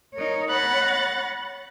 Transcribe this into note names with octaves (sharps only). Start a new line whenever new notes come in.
D#4 A#4 C#5
C#5 F#5 B5 F#6 A6 A#6